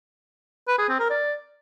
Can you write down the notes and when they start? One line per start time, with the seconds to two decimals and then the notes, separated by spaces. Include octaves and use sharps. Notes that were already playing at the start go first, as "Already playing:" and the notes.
0.68 B4
0.78 G#4
0.89 C4
0.99 A#4
1.10 D5